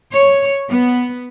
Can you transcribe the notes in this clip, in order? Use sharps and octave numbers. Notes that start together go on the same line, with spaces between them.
C#5
B3